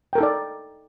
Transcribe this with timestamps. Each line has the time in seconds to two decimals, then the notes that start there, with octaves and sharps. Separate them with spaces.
0.13 G5
0.15 A#4
0.18 A4
0.20 D#4
0.23 D5